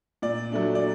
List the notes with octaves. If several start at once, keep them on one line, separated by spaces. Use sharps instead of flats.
A#2 D5
F#3 A3 D4
D5